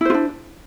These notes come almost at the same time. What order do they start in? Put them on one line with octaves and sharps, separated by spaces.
E4 C5 F4 D4